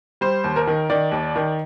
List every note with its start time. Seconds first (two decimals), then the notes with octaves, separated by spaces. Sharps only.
0.21 G3 C5
0.44 D#2
0.56 A#4
0.67 D#3
0.90 D#3 D5
1.12 D#2
1.36 D#3